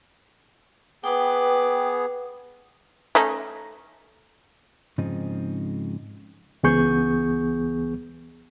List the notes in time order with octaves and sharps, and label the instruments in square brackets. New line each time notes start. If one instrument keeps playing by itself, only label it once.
[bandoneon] B3 G#4 [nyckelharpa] B4 D6 [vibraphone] G5
[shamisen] A3 C#4 D#4
[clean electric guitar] G#2 C#3 F3 G#3 C4 D#4
[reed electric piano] C#2 E3 B3 G#4 C#6 G6